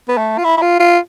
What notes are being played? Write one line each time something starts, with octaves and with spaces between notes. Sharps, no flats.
B3
A3
F4
E4
E4
F4
F4